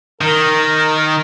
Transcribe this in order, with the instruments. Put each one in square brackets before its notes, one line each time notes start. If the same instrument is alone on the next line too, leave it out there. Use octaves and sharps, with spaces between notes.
[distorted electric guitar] D#3 [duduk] A#4